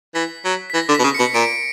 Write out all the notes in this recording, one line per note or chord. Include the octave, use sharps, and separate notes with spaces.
E3 B6
F#3
B6
E3 A#6
D3
B2 B6
C#3
B2 C#7
A#2 D7